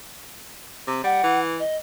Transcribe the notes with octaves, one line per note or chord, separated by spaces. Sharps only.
C3
G3 F#5
E3
D#5